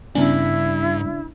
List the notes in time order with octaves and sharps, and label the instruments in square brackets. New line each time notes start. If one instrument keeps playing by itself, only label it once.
[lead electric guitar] G2 [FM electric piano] C#3 D4 [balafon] B3 C#4 [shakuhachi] E4